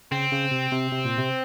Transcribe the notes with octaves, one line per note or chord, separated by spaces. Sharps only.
C#3 C4
C#3
C3
C3
C3
A#2
C3